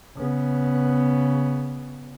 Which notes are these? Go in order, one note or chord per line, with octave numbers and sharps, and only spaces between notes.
C#3 B3